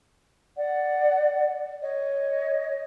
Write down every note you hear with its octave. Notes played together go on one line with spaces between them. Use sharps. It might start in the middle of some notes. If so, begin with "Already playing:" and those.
D5 F#5
C#5 D#5